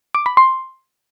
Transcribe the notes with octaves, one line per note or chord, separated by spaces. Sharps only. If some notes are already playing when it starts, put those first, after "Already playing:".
D6
B5
C6